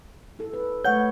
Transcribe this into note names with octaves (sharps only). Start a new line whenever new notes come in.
E4 A4
B4
A3 B4 C#5 F#5 G6